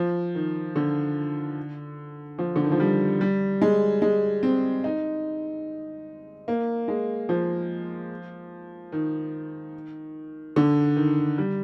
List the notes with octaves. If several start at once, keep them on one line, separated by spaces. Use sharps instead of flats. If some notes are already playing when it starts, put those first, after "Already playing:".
Already playing: F3
D#3
D3
F3
D3
D#3
F3
G3
G3
G#3
G#3
C4
D#4
A#3
G#3
F3
D#3
D3
D#3
G3